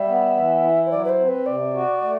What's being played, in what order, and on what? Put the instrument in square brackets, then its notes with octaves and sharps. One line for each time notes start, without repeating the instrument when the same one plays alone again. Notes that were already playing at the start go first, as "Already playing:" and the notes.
Already playing: [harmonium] G3 [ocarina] E5
[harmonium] B3
E3
E4
[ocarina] C5
[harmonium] F#3 [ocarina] D5
[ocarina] B4
C5
[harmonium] C4
[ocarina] B4
[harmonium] C3 [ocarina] D5
[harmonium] F#4
A3